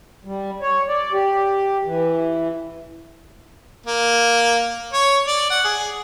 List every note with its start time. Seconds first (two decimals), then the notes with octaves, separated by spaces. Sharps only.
0.25 G3
0.62 C#5
0.88 D5
1.12 G4
1.85 E3
3.86 A#3
4.93 C#5
5.27 D5
5.50 F#5
5.65 G#4